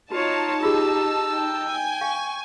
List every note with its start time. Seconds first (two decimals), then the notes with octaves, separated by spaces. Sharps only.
0.12 D#4 F4 F#4 C#5 A5
0.63 F4 G4 G#4 E6
1.32 G5
1.69 G#5
2.01 F5 C#6